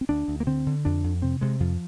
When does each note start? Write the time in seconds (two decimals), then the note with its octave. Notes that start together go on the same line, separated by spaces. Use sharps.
0.01 C4
0.09 D2 D4
0.28 D2
0.40 A#3
0.47 D3 C4
0.67 D3
0.85 F2 D4
1.04 F2
1.22 C3 C4
1.41 C3 G#3
1.60 F2 F3